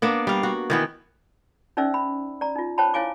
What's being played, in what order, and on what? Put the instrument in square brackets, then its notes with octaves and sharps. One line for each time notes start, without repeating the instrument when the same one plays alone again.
[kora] A#3 B3 D4
G3 F5
F#4
D#3 E3 B3
[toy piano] C#4 D#4 C5 D5 E5 E6
B5
D5 A#5
D#4 F4
C5 C#5 G5 A5 B5
E4 C#5 F5 G#5 D6